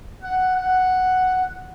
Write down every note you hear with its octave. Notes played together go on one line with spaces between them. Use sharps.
F#5
F#5